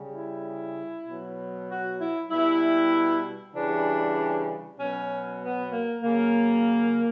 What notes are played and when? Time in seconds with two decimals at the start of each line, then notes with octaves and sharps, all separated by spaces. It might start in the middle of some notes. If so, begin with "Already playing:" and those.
Already playing: C#3 G3
0.13 E4
1.05 B2 F#3
1.68 F#4
1.99 E4
2.30 B2 G3 E4
3.53 C#3 E3 G3 D4
4.78 B2 F#3 C#4
5.40 B3
5.71 A#3
6.01 C#3 F#3 A#3